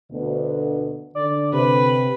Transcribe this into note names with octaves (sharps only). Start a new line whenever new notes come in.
D2 B2
D3 D5
C3 B4